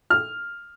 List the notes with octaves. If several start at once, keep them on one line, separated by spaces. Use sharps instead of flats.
F6